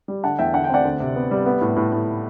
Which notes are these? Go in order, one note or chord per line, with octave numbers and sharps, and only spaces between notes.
G3
D3 F#5 A5
E2 E5 G5
D3 F#5
G5
C4 D5 F#5
D2
C3
B3
G3
B3
A2
A2
A2